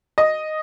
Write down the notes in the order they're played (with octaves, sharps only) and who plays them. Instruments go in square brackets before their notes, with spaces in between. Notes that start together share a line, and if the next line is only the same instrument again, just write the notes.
[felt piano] D#5